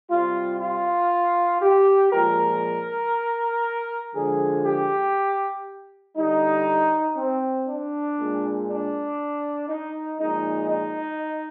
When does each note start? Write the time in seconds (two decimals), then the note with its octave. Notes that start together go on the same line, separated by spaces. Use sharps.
0.10 C3 G3 F4
0.61 F4
1.62 G4
2.13 A#2 F3 G#3 A#4
4.14 D3 F3 G#3 G#4
4.66 G4
6.17 D3 G3 D#4
7.17 C4
7.68 D4
8.18 A#2 G#3
8.68 D4
9.69 D#4
10.20 A#2 F3 G#3 D#4
10.70 D#4